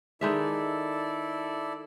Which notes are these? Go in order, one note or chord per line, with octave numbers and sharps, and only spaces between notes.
D#3 G#3 E4 A4 D5 E5